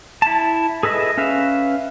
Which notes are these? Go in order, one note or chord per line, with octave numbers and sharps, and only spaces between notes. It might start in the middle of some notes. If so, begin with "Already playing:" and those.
E4 A5
G#4 A4 B4 D#5 E5
C#4 B4 E5 F5